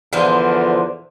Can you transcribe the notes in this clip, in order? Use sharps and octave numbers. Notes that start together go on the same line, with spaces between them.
E2 D3 F3 C5